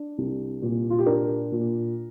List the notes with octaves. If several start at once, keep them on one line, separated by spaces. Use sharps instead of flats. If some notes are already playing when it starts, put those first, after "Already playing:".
Already playing: D4
C2
A#2
F4
G4
D4 A#4
A#2